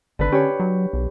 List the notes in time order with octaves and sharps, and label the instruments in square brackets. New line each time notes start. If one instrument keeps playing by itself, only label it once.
[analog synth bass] G#1 [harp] D3 B4
[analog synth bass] C#4 [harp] G4 C#5
[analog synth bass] F#3
B1